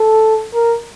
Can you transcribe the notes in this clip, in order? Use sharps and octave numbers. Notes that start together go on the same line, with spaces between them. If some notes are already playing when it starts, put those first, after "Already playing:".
Already playing: A4
A#4